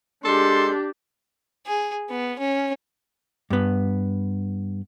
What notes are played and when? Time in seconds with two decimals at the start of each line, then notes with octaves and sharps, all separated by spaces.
0.24 G#3 D4 G4 A4 C6
1.67 G#4
2.10 B3
2.39 C#4
3.50 G2 B3